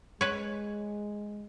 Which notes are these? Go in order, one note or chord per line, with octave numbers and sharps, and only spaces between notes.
G#3 B4 C#5